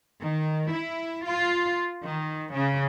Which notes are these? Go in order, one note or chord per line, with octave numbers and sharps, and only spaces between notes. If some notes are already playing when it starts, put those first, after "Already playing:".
D#3
E4
F4
D#3
C#3